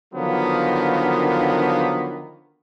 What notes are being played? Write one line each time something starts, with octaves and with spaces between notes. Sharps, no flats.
D3 D#3 F3 F#3 A#3 B3